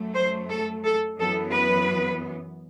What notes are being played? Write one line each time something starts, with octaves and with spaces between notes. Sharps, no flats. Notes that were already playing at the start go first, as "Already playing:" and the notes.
Already playing: F#2 F#3 A3
C5
A4
A4
F#2 E3 B3 A4
B4